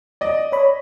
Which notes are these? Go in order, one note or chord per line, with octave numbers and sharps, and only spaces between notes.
D5 D#5
C#5 B5